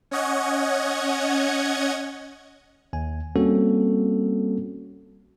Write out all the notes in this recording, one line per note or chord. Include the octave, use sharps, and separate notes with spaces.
C#4 C#5 D#5 F#5 G#6
D#2 G#5
G3 A#3 C4 C#4 F#4 A4